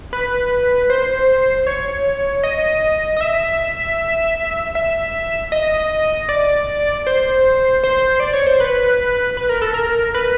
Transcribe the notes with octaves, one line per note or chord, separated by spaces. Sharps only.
B4
C5
C#5
D#5
D#5
E5
E5
D#5
D5
C5
C5
D5
C#5
C5
B4
B4
A#4
A4
A#4
B4